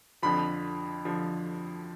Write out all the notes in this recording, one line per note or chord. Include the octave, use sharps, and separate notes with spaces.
F2 D3 F3 B5
D3 F3